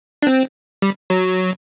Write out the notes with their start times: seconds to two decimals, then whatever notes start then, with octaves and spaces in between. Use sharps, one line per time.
0.23 D4
0.27 C4
0.82 G3
1.10 F#3